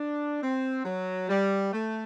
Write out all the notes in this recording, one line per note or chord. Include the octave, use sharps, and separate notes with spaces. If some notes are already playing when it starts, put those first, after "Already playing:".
Already playing: D4
C4
F#3
G3
A3